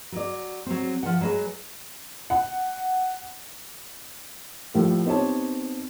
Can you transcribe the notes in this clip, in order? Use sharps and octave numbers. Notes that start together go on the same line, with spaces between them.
F#3 D5
F#3 C4
F3 F#5
F#3 G#3 B4
F#5
A2 F3 G3 A3
B3 C4 D#4 G4 C#5 A5